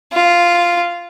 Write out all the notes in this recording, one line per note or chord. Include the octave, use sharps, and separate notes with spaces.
F4